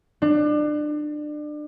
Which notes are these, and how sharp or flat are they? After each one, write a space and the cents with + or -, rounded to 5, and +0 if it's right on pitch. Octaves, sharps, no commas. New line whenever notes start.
D4 +30